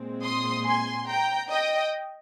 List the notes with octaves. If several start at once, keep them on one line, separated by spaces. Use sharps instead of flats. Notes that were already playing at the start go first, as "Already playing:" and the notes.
Already playing: A#2 G#3 C4
C6 D#6
G#5 C6
G5 A#5
D#5 G5